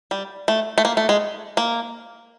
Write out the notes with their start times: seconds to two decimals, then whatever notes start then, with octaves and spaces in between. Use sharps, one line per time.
0.11 G3
0.48 A3
0.78 A3
0.85 A#3
0.97 A3
1.09 G#3
1.57 A#3